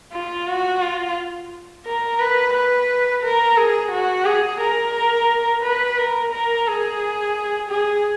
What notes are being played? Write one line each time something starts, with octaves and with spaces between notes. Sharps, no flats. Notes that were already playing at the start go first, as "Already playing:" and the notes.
F4
F#4
F4
A#4
B4
B4
A#4
G#4
F#4
G#4
A#4
B4
A#4
A#4
G#4
G#4